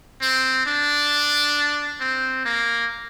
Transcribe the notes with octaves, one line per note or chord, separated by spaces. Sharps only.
C4
D4
C4
A#3